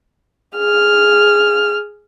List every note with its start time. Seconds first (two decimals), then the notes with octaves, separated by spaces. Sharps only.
0.56 G#4 F6